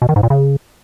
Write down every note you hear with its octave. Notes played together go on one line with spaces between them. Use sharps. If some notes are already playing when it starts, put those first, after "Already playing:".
B2
D#3
G#2
A#2
C#3